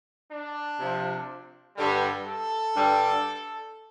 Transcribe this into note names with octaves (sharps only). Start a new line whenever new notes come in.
D4
C3 F3
G2 D3 G3
A4
G2 D3 G3